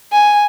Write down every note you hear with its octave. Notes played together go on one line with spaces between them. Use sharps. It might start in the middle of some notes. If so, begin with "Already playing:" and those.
G#5